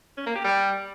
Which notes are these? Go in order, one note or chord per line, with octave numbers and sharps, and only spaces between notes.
C#4
A#3
G4
G3